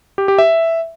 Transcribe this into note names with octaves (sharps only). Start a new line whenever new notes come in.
G4
G4
E5